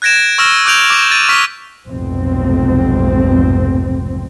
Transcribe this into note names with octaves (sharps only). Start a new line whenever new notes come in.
F#6 G#6 A#6 D7 E7
C#6 E6 F6 A#6 E7
D6 F#6 G6 D7 F7 F#7
D6 A#6
A6 D#7
C#6 F6 B6
F1 B1 F2 G#2 B2 C4